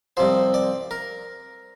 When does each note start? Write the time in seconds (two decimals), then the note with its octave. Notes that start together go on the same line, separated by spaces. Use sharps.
0.17 C2 C3 F3 C5
0.54 D5
0.91 A#4